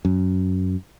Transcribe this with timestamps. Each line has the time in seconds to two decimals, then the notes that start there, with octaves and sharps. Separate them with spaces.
0.05 F#2